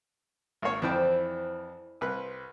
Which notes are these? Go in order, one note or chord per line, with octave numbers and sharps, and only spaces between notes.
G#1 A#3 C#5
F2 E3 E4 C5 D5 G5
C2 B4 F#6